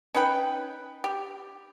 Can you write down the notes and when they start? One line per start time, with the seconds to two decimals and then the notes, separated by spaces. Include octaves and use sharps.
0.14 C#4 D#4 B4 G5
1.04 G4